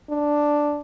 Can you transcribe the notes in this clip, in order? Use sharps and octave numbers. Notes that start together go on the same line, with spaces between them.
D4